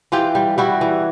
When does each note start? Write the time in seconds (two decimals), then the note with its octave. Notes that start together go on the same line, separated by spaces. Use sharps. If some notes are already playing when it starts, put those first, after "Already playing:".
0.12 E3 F4 G4
0.35 G3
0.58 G3 E4 F#4
0.81 E3